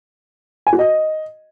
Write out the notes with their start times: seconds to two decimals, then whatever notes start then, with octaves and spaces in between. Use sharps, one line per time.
0.67 G#5
0.73 F#4
0.79 D#5